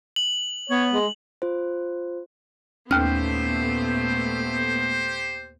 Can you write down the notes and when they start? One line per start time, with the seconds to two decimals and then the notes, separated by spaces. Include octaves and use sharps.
0.16 F#7
0.70 B3 C#5
0.93 G#3
1.42 F4 C5
2.91 D#2 A#2 A3 B3 C#4 G4 C5 F6